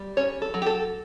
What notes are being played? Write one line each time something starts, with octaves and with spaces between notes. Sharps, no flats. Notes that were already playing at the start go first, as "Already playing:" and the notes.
Already playing: G3
C#4 C#5
A4
F#3
G4
A4